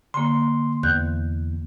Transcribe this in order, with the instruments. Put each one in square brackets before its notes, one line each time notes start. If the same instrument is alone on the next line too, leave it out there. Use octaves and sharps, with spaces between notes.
[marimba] D3 A#3 [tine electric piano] C6
[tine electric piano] E2 [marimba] F#6 G6